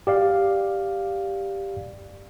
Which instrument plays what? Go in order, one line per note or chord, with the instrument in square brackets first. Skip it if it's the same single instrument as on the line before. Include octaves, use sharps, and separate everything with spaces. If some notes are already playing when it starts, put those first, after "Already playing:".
[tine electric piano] G4 D5 F5